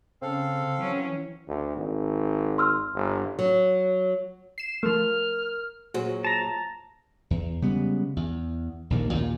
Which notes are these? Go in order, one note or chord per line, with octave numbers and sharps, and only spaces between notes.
C#3 C4 A4 F5
E3 F#3 C#4
D2
G#1
C6 E6 F6
G1
F#3
C7 E7
F3 A3 A#4 F6
A#2 F#3 F#4 G#4 C5
A5 A#5
E2
C#3 G3 G#3 B3
E2
A#1 D#2 D3 A#3
D#2 A#2